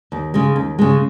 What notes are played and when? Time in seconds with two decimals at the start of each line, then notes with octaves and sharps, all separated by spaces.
0.12 D#2
0.34 C#3 G#3
0.56 D#2
0.79 C#3 G#3